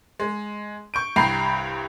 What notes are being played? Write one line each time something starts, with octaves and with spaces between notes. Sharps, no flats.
G#3
C#6 G6 D7
C2 G2 G5 A#5 B5 C7